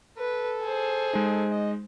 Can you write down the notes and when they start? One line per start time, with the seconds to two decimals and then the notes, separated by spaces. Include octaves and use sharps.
0.18 A4 B4
0.62 G#4 C5
1.13 G#3 D#4
1.51 D#5